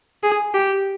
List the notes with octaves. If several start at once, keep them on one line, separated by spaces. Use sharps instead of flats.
G#4
G4